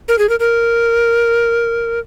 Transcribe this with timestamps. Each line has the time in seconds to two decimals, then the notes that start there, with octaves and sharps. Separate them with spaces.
0.08 A#4
0.18 G#4
0.29 A#4
0.40 A#4